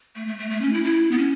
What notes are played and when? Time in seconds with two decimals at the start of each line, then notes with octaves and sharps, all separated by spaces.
0.16 A3
0.27 A3
0.39 A3
0.50 A3
0.62 C#4
0.73 E4
0.84 E4
1.11 B3
1.18 C#4